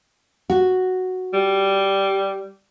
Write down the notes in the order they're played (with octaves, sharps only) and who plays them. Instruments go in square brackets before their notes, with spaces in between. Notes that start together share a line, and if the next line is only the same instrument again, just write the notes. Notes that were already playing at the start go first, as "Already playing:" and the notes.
[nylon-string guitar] F#4
[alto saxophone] G3